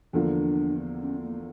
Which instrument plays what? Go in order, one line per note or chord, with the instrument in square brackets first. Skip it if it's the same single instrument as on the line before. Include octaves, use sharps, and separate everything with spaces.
[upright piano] E2 D3 F3 A#3 [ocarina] D4
[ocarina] C#4
A#3